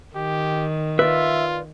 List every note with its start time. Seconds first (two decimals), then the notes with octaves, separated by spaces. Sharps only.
0.16 D#3 G4
0.99 F4 B4 D5 E5